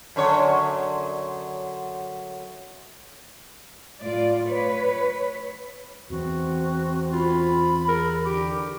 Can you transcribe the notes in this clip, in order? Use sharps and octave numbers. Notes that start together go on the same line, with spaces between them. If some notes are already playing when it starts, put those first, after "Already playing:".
F#2 D3 C#5
A2 F4 D5
B4 C#5
E2 E3 C4 F#4
F4 B5
G#4 A#4
D3 G4